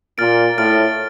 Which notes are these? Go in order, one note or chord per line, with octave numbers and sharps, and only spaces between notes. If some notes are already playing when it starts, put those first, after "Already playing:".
A#2 F6 A6 D7
A2 F6 A6 D7